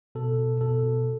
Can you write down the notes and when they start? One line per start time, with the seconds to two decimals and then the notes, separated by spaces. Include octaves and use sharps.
0.15 B2 A4
0.38 B2
0.61 B2 A4
0.83 B2